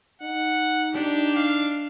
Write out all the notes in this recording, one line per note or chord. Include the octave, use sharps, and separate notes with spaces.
D#4 F#5
D4 G4
F5